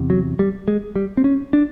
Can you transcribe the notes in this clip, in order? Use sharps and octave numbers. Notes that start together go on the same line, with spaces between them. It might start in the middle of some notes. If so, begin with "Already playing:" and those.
Already playing: E2 C3
F#3
G3
G#3
G3
C4
C#4
D4